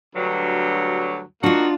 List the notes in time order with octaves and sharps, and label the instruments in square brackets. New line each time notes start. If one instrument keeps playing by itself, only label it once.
[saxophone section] D2 G2 F#3
[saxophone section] A#3 D#4 F#4 [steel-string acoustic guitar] D4 F4